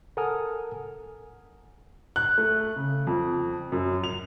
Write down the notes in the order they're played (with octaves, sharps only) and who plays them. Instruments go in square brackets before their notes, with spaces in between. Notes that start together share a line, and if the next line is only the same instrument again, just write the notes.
[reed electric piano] A4 A#4 F#5 G#5 D#6 F6
[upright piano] F#6
A3
C#3
F2
F#2
F7